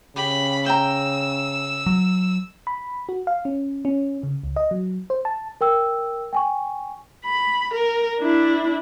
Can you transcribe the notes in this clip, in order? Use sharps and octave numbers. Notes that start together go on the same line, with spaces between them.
C#3 G4 B5
G5 A#5 E6
F#3
B5
F#4
F5
C#4
C#4
C#3
C#2
D#5
F#3
C5
A5
A#4 G5 E6
G5 G#5 C#6
B5
A#4
D4 E4